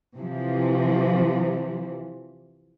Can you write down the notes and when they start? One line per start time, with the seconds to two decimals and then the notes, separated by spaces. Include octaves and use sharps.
0.16 C3 E3 F3